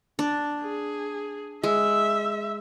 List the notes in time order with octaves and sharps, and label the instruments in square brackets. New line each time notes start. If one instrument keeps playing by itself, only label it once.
[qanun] D4
[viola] G#4
[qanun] G#3 [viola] E5